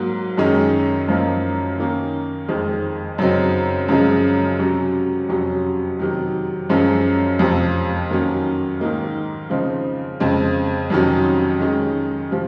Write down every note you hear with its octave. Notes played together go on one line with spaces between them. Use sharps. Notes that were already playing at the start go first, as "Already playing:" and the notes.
Already playing: G#2 F#3 A#3
F#2 D#3 G#3 C#4
F#2 F3 A#3 D#4
D#3 A#3 C#4
F2 D#3 G#3 C4
F#2 C#3 F#3 C4 D#4
F#2 C#3 F3 G#3
C3 F#3 C#4
F2 C3 F#3 C#4
C3 D#3 F#3
F#2 F3 G#3 C#4
F2 C3 F3
D#3 F#3 A#3 C#4
G#2 D#3 A#3 D#4
C#3 F3 C4 D#4
F2 C#3 G#3 C4
F2 C3 D#3 F#3 C#4
D#3 G#3 C#4
C3 F3